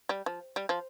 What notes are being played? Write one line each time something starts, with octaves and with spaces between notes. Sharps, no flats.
G3
F3
G3
F3